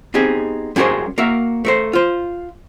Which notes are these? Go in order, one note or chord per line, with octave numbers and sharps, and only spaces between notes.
B3 C4 D#4 G4 G#4
G3 C#4 F#4 G#4 A#4 C5
A#3 F#4 A#4 E5
A3 A#4 C5
F4 C5